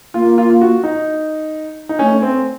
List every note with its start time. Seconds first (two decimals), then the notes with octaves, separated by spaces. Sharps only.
0.14 A#3 F4
0.38 F4
0.50 F4
0.61 F#4
0.84 D#4
1.89 D#4
1.99 A3 C#4
2.22 C4